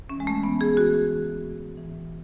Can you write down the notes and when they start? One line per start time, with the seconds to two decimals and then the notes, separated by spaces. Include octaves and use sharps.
0.09 E3 C#4
0.20 G#3
0.27 A3
0.43 E3 B3
0.61 G#4
0.77 E3 F#4
1.10 E3
1.44 A2
1.77 E3